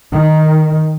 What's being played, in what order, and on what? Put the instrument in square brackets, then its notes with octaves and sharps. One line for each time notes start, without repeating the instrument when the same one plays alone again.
[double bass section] D#3